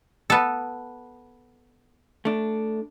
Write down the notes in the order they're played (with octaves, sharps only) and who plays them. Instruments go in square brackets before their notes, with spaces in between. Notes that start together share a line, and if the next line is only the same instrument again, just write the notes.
[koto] B3 A4
[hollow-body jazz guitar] A3 D4